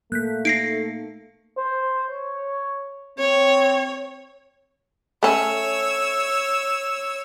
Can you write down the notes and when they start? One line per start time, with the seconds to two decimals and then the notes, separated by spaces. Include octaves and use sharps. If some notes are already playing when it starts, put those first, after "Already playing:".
0.12 A3 A#3 F#6 G6 B6
0.45 D#4 A#6 C7 D7
1.58 C5
2.11 C#5
3.19 C4 C#5
5.23 A3 C#4 C#5 E6